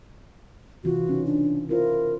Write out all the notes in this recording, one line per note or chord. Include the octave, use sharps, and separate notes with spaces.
C3 E3 F4 F#4
C#3 C#4 D#4
D4
E4 F4 A#4 C5